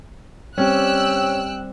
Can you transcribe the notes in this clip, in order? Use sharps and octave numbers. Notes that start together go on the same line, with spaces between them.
G3 C4 C#4 G4 G5 E6 F#6